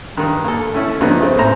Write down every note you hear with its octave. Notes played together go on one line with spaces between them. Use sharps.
G2 D#3
A#3 A4
A3 C#4 E4 A4
G2 C3 F3 A#3 B3 D#4
C#3 A3 C4
A1 A2 C5 A#5